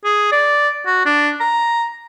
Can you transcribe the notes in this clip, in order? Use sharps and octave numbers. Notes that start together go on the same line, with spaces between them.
G#4
D5
F#4
D4
A#5